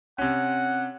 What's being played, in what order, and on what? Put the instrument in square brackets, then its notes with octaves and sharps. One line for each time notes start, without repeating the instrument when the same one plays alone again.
[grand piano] C3 C#4 [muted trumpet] F#5